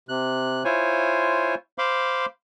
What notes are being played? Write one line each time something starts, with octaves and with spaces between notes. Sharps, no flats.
C3 F#6
E4 F4 C5 C#5 G#5
C5 F5 B5 C6 D6